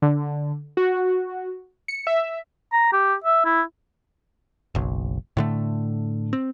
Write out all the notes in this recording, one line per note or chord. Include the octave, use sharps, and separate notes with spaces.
D3
F#4
C#7
E5
A#5
G4
E5
E4
F#1 B1
A2 D3 A3
C4